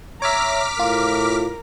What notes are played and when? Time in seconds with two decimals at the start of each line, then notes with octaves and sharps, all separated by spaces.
0.22 C#5 E5 A#5 D6 F6 B6
0.79 A2 F4 A#4